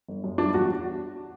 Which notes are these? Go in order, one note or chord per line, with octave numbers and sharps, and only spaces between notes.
G1
F#2
G3 D4
E2 F#4